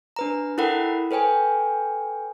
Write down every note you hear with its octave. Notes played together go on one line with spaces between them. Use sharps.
D4 B4 A#5
E4 A4 A#4 F#5 G5 B5
A4 B4 C#5 G5 G#5